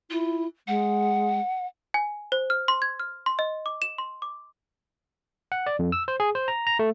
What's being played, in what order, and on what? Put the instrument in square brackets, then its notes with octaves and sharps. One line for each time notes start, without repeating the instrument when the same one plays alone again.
[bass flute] E4 [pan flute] F4
[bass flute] G#3 [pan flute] F#5
[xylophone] G#5
C5
F6
C6
G#6
F6
C6
D#5
D6
E7
C6
D6
[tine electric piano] F#5
D5
F2
E6
C5
G#4
C5
A#5
A#5
A3